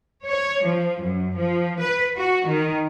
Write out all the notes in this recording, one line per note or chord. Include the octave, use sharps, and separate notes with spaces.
C#5
F3
F#2
F3
B4
F#4
D#3